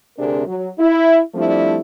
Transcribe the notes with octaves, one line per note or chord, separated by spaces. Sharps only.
D2 C3 C4 D4 G#4 A#4
F#3
E4
F3 G3 A3 C4 D4 E4